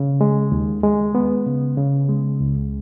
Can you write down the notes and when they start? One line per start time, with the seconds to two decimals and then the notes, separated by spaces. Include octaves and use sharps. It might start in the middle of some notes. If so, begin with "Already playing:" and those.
Already playing: C#3
0.21 G#3
0.52 D#2
0.83 G#3
1.15 B3
1.46 C#3
1.78 C#3
2.09 G#3
2.40 C#2